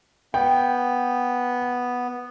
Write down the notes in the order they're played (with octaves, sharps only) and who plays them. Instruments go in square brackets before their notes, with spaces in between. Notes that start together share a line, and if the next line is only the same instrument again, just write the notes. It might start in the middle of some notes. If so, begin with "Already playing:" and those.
[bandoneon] B3 [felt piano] G5